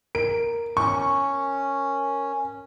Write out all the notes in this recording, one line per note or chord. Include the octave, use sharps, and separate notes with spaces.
A#4 D7
C#4 C#6